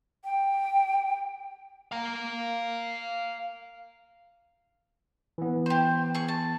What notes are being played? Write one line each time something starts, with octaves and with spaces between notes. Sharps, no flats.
G5
F5 A#5
E3 B3
G4 C5
G#4 C#6
A5